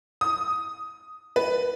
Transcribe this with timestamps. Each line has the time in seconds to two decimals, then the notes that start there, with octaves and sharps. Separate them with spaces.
0.21 D#6
1.36 B4